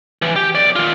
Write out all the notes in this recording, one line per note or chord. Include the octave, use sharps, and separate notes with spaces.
E3
G4
B1 D5
D#3 F4